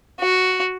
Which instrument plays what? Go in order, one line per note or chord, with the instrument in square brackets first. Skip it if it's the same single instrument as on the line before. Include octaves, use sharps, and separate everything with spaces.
[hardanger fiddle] F#4